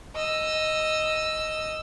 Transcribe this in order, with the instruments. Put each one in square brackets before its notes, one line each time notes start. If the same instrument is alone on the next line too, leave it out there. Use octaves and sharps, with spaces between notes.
[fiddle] D#5 E6